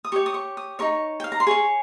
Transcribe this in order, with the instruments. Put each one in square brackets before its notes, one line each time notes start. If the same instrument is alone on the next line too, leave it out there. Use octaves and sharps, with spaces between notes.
[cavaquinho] D#6
G4 C#5 C#6
D#6
C#6
D#6
D#4 A#4 C#5 C#6
G5
F5
A#5
C6
G#4 C#5 C#6